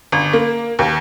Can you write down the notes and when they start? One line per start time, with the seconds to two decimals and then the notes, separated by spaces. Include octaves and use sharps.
0.12 G1
0.33 A#3
0.79 D#2